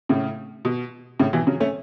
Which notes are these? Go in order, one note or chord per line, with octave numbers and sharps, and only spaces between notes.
A2 C#3
B2
A2 C#3
B2 E3
C#3 F#3
A3 C#4